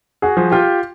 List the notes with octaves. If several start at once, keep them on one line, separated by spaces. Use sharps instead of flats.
F#4 G#4
F3
F4 G4